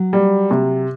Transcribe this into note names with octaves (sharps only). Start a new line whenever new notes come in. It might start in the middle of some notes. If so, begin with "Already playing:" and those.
Already playing: F#3
G3
C3